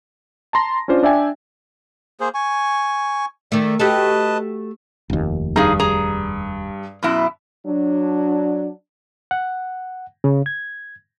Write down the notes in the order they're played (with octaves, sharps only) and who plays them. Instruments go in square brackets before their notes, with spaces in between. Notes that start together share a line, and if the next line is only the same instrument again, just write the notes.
[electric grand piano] A5 A#5 C6 A#6
C#4 D4 F4 C5 D5
D4 D5 E5 G5 G#5
[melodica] A#3 G#4 C5
G#5 C#6
[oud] D#3 A3 [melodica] D5
[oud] A3 F#4 G4 [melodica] B4 D#5 A5
[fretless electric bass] F1 D#2
[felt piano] G2 [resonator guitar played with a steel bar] D#4 G#4 F5
[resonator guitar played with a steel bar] G#4 A#5
F#2 B2 E4
[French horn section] F#3 D4
[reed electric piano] F#5
C#3
G#6